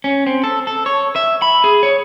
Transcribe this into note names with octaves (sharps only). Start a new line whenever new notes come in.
C#4
C4
A4
A4
C#5
E5
B5
G#4
C#5